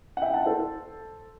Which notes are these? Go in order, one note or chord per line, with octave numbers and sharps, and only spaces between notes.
F#5
E5 G5
F#5 A5
A4 C5